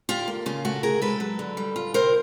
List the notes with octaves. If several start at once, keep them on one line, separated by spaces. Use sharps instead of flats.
D3 F4 G4
A#3
C#3 F4
A3 F#4
C3 G#4 A#4
G#3 A4 B4
F#3
D3
G3
F4
C3 A#4 C5